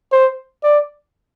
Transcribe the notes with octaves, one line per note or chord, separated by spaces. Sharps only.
C5
D5